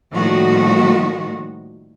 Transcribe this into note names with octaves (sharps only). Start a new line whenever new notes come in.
A2 D#3 F3 G3 A#3 F#4